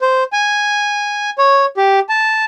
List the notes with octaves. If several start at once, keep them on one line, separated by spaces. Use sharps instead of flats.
C5
G#5
C#5
G4
A5